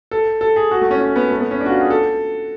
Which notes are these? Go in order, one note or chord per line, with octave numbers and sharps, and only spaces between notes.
A4
A4
G#4
F#4
A3
C#4
C#4
B3
A3
B3
C#4
D4
F#4
F4
G#4
A4